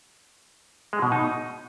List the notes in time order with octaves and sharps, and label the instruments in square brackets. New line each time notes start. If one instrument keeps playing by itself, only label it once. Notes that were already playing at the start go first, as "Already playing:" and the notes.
[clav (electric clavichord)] G#3
B2
D#4